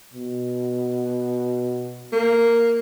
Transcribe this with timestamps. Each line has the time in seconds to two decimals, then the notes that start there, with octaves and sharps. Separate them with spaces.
0.14 B2
2.12 A#3